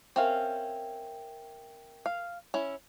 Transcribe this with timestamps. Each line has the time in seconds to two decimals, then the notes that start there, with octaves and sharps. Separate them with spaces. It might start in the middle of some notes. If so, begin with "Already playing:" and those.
0.16 C4 C#4 A#4 E5 F5 G5
2.06 F5
2.54 C#4 E4